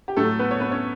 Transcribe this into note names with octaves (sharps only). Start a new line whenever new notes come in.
G4
A2 F#3 A3 A4
B3 B4
C#5
B3 B4
C#4 C#5